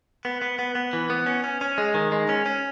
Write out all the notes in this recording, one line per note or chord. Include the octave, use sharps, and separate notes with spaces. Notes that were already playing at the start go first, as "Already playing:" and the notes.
B3
B3
B3
B3
E3
B3
C#4
C#4
C#4
G#3
D#3
G#3
C#4
C#4